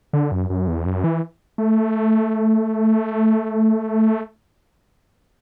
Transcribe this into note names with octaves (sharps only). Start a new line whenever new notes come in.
D3
F#2
F#2
E2
F#2
E3
A3